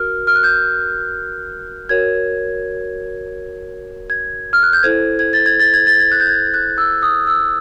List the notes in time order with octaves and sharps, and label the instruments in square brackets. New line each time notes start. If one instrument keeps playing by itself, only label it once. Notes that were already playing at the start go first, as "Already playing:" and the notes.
Already playing: [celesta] F#4 A#4 F6
F6
F#6
G6
F#4 A#4 C#5 G#6
G#6
F6
F#6
G6
E4 A4 C5 G#6
G#6
A6
G#6
A6
G#6
A6
G#6
F#6
G6
G#6
F#6
E6
D#6
E6